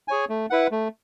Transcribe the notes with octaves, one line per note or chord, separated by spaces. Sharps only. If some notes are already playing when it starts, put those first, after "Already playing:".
G#4 C#5 G#5
A3
E4 B4 F#5
A3